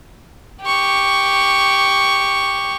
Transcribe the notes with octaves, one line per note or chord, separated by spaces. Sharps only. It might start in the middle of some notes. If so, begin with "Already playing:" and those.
G4 C#6